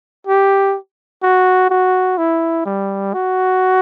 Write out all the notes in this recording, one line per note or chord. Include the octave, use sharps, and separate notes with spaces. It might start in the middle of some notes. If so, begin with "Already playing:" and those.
G4
F#4
F#4
E4
G3
F#4